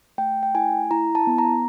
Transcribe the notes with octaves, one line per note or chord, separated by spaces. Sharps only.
A3 G5
G5
E4 G#5
E4 A#5
A5
B3
A#5